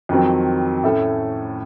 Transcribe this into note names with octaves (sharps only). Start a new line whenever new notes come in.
F2 D#3 F#3 C4
A2 A3 C#4 A4